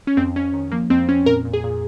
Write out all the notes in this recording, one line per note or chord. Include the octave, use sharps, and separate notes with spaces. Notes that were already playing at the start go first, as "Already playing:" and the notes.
C#4
F2 C4
F2 C#4
D#3
F3 A#3
F2 C4
F2 C#4
A#2 A#4
A#2
G#4
A#2